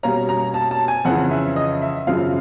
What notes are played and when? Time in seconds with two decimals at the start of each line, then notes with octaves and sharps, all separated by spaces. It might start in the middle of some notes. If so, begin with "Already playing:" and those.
0.03 B2 G3 A#3 C#4 A#5
0.29 A#5
0.54 A5
0.71 A5
0.88 G#5
1.05 F2 C#3 E3 F#5
1.31 E5
1.56 D#5
1.82 E5
2.07 F#2 C#3 F3 F5